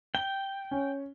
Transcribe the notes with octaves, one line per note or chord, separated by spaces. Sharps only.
G5 G7
C#4